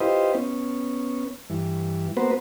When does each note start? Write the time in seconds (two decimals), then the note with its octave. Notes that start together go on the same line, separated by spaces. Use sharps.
0.01 E4 F4 G4 B4 C5 D#5
0.35 B3 C#4
1.50 G2 E3
2.17 A#3 B3 F#4 B4 C5